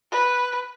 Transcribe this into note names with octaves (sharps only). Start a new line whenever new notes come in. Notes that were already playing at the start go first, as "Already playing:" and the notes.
B4